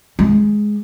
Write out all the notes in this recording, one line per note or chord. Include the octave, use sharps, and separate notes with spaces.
G#3